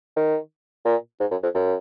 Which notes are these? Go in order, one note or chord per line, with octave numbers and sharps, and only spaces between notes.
D#3
A#2
G#2
F#2
F2
F#2